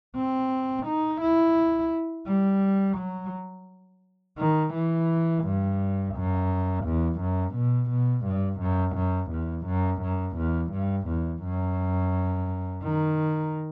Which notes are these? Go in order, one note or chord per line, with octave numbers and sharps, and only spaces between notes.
C4
D#4
E4
G3
F#3
D#3
E3
G2
F#2
E2
F#2
B2
B2
G2
F#2
F#2
E2
F#2
F#2
E2
G2
E2
F#2
D#3